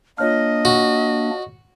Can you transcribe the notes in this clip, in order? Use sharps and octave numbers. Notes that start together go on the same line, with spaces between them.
A#3 D4 F4 C#5 D#5 F6
F#4